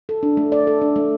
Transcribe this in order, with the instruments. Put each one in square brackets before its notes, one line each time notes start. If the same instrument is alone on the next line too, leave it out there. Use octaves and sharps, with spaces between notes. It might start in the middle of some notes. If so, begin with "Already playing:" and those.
[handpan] A4
D4
A3
D5
A4
D4
A3